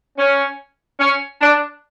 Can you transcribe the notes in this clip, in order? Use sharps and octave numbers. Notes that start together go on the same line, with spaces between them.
C#4
C#4
D4